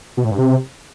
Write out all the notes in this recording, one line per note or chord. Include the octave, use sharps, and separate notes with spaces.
B2
A2
G2
C3